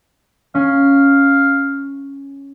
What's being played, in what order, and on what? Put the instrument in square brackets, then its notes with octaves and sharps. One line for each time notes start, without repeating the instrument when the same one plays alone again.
[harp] C#4 [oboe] F5